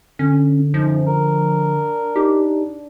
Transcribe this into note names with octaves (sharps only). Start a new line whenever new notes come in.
D3 C#4
F#2 F3 D#4
D4 A#4
D#4 G4